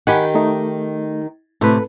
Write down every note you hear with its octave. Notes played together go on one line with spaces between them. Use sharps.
D#3 G4 F#5 G#5 B5
A3 D#4
A2 C3 A4 B4